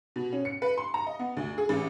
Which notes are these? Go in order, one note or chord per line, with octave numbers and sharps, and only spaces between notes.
B2
C#4
C#7
B4
C6
A#5
D#5
B3
D2
G#4
A1